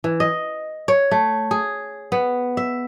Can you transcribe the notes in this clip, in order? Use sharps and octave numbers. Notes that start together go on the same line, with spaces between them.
E3
D#5
C#5
A3
G#4
B3
E5